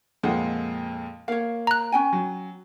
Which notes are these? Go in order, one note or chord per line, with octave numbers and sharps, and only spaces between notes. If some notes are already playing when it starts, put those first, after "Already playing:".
F2 A#2 G#3 C5 F#5
A#3 C#5 F5
A#5 F#6
C#4 G5 G#5
F#3